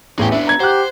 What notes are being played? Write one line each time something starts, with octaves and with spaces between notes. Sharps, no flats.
A1 E2 G#4 G5
B3 D4 E5
A#5 G#6
G4 C5 F#5 F#6